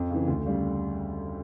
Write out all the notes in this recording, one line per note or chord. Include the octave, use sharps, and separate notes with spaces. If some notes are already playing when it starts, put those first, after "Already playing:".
Already playing: F2
C#3 E3
D2
C#3 G3